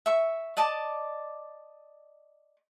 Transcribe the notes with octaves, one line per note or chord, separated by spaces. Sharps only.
E5 C#6
D5 D#5 A5 D6